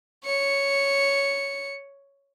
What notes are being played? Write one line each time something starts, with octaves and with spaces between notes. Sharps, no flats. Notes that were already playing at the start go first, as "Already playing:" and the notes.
C#5 C#7